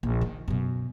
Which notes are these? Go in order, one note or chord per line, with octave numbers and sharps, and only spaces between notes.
A#1
D#3
F#2 B2